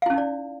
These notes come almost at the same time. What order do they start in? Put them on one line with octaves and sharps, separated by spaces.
F5 E4 C#4 D#4 D5